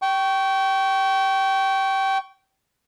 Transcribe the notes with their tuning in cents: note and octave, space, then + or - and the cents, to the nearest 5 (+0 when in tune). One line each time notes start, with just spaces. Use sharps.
G5 -20 C#6 +5